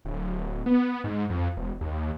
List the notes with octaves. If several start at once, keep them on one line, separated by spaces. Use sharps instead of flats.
D1
B3
G#2
F2
E1
D#2